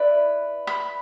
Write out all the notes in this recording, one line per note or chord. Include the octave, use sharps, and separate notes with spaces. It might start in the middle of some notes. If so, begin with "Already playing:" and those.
Already playing: E4 B4 D5
B5